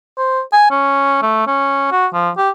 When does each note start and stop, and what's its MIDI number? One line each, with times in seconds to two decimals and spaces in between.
0.17 0.41 72
0.52 0.66 80
0.71 1.18 61
1.22 1.46 57
1.47 1.90 61
1.91 2.06 66
2.13 2.30 53
2.37 2.50 67